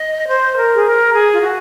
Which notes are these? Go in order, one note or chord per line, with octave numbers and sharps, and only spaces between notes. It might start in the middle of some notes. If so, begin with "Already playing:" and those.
Already playing: D#5
C5
A#4
G#4
A#4
G#4
F4
F#4